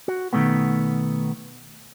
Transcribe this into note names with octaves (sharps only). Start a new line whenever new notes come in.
F#4
B2 D#3 E3 G#3 A3 B3